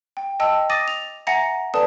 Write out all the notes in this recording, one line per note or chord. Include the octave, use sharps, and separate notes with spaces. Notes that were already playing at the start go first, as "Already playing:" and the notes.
G5
D#5 G5 A5 E6
D6 D#6 A6 A#6 D#7
F7
E5 F#5 G#5 A#5 A#6 C#7
A4 B4 D5 A5 D#6 E7